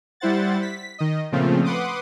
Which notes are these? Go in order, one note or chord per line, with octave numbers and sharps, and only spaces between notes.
G3 E4 C5 F#5 A6
B6
D#3 D#5
A#2 C#3 F3 A3 C4 F4
B4 F#5 C6 D6 D#6